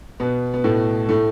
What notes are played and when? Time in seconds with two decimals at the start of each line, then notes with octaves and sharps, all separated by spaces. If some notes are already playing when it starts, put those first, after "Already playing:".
0.20 B2 B3
0.54 B3
0.64 A2 A3
1.09 A2 A3